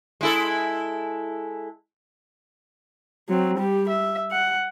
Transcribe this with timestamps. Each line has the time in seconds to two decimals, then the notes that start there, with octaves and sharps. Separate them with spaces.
0.21 G#3 E4 A4
3.29 F#3 C4
3.58 G3 G4
3.89 E5
4.31 F#5